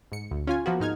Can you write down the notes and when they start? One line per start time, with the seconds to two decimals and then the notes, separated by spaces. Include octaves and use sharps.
0.12 G#2 C#7
0.31 D2
0.47 C#4 F4 G#5
0.66 F3 A#3 B3 F#4
0.80 G#2 D#4 F6 G#6